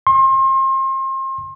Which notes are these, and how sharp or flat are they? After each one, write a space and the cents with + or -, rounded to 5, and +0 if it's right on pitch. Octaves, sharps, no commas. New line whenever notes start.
C6 +35